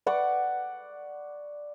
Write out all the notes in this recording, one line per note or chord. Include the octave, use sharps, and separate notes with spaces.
D5 F#5 C#6 D6